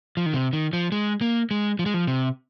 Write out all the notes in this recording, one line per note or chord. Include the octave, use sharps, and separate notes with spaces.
F3
D#3
C3
D#3
F3
G#3
A#3
G#3
F3
G#3
F3
C3